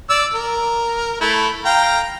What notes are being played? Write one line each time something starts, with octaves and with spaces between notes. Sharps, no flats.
D5 E6
A#4
A3 E4
F5 G5 A#5